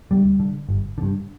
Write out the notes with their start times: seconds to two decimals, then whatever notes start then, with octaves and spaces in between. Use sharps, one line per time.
0.11 D2 G3
0.40 D3
0.69 G1
0.98 D3
1.02 G2